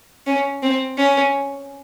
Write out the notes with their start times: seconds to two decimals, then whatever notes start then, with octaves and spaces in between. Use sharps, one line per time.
0.27 C#4
0.62 C4
0.98 C#4